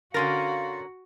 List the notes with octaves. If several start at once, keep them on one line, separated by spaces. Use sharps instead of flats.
D3 C#4 F#4 A#4 F5 C6 A6 A#6